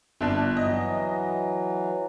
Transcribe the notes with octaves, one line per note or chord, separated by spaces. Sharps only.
G1 D4
E3 F#3 D#5